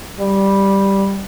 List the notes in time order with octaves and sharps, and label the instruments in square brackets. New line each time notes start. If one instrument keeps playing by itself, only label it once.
[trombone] G3